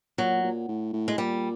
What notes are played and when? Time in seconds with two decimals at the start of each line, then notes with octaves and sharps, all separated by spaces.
0.18 A#2 F#3
0.44 A#2
0.68 A2
0.93 A2
1.08 G#3
1.18 A#2 G3